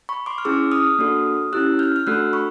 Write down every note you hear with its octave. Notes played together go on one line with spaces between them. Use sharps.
B5 C#6
C6 D6
F6
C#4 E4 G#4 D6 E6
D#6 F6
A#3 D4 F#4 A4
C#4 E4 G4 E6 F#6
F6 G6
F6
A3 D4 F#4 A4 E6 F#6
B5 C#6